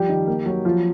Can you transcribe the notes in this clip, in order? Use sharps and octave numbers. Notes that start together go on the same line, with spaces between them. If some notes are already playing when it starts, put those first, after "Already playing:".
Already playing: F3 G3 G4
D#3
A#3
F#3
F3 F4